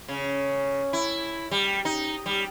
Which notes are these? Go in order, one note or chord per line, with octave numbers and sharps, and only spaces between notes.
C#3
E4
G3
D#4
G3